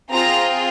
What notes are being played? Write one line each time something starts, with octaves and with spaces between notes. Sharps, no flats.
C4 F4 G#4 A#5